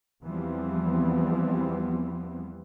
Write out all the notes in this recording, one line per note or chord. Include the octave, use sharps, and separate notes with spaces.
E2 E3 F3 G3 B3 C4